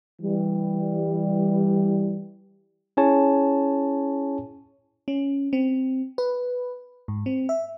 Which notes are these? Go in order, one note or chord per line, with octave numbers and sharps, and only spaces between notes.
E3 G3
C#4 E4 G#4 C#5 G#5 A5
C#4
C4
B4
G#2
C4
E5